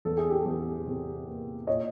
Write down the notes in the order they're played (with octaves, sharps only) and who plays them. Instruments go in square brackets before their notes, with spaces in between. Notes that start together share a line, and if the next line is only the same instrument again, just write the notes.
[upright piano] E2 A4
G#4
G4 A4
E2
C3
A#3
A#2 C#5 D#5